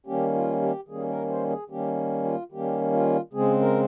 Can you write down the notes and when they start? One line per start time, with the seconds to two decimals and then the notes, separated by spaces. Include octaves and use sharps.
0.06 D#3 G3 A#3 C#4 G4
0.34 F4
0.62 G4
0.88 D#3 G3 A#3 C#4 G#4
1.09 A#4
1.29 C5
1.50 G#4
1.70 D#3 G3 A#3 C#4 G4
2.24 F4
2.52 D#3 G3 A#3 C#4 G4
2.92 F4
3.33 C#3 G#3 C4 G#4
3.61 A#4